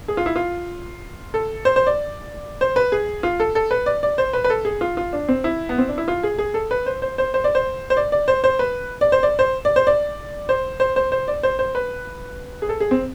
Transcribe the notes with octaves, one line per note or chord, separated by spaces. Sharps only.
G#4
F4
E4
F4
A4
C5
C5
D5
C5
B4
G#4
F4
A4
A4
B4
D5
D5
C5
B4
B4
A4
G#4
F4
F4
D4
C4
E4
B3
C4
D4
E4
F4
G#4
G#4
A4
B4
C5
C5
C5
C5
D5
C5
C5
D5
D5
C5
C5
B4
D5
C5
D5
C5
D5
C5
D5
C5
C5
C5
C5
D5
C5
C5
B4
G#4
A4
G#4
C4